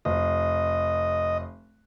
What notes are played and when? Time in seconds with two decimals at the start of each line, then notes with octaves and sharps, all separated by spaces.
0.05 F1 D#5